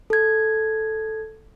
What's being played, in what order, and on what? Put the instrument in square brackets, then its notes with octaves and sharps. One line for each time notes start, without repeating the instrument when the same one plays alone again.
[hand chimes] A4 G#6